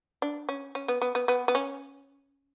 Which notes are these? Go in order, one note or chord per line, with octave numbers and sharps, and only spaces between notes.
D4
C#4
C#4
B3
B3
B3
B3
B3
C#4